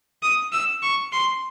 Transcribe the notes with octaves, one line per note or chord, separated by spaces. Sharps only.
D#6
E6
C#6
C6